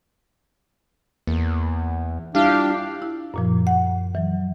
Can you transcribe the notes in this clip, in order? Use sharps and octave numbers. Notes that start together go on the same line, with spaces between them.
E2 A#3
G3 D4 E4 F4 G4 F5
E4
F#2 A#2 F3
F#5
E3 F#3